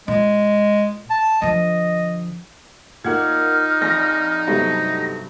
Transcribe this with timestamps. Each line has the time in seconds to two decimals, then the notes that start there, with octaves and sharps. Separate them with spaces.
0.08 A#2 G#3
1.10 A5
1.42 D3 F3 D#5
3.04 A#2 A#3 D#4 F#5 F6 G#6
3.81 A#1 F2 A#6
4.47 G2 C3 F#3 G3 A3 B3 A#6